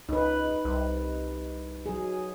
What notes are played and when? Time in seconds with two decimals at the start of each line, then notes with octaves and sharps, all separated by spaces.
0.09 C#2 D#4 B4
0.65 C2
1.86 F#3 G#4